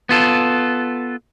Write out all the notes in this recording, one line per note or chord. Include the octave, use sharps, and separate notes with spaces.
B3 F4 A4